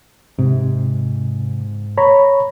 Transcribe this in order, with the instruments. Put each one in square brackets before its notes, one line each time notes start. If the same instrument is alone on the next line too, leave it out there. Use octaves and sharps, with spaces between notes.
[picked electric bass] G#2 [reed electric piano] C3
[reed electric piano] C#5 A#5 B5